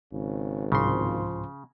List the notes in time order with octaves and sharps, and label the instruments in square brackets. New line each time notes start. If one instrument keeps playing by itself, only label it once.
[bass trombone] G#1 [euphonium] C#3
[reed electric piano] C2 G#2 C6 [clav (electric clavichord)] C#3 [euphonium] F3